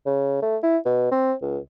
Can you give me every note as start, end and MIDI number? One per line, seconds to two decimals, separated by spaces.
0.06 0.37 49
0.43 0.57 57
0.63 0.77 64
0.85 1.11 47
1.11 1.34 60
1.42 1.58 37